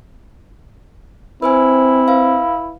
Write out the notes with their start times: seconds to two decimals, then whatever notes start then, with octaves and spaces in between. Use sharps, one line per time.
1.42 C4 E4 B4 C5 G#5
2.08 B4 F5